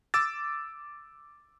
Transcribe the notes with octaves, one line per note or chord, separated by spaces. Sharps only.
D6 E6 A6